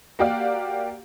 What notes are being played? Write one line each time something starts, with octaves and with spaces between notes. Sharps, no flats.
A#3 F#4 G4 D5 F5